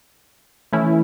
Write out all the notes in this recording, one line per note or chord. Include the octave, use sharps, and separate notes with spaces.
E3 A3 C#4 E4